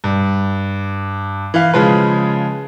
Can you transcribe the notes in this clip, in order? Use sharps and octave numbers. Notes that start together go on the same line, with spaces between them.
G2
E3 F5
C#3 F3 G#3 B4